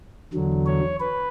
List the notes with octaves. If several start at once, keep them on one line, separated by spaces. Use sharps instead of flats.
E2 D3 F#3
C#5
B4